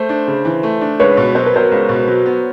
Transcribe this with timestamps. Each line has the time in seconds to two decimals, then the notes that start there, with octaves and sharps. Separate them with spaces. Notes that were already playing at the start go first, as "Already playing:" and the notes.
Already playing: A3 C5
0.09 D4
0.27 C#3
0.45 E3
0.63 A3
0.81 D4
1.00 C#2 B4 C#5
1.17 B2
1.35 F#3 C5
1.46 B4
1.54 B3 A#4 C5
1.71 C#2
1.89 B2
2.07 F#3
2.26 B3